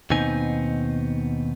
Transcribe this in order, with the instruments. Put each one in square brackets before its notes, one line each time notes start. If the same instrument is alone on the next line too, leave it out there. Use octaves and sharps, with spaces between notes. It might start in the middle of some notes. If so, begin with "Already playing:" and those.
[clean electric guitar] D#2 B2 B3 C4 D#4 G#5